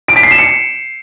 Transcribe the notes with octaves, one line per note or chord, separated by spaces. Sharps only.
D7
B6
C7
E7
C#7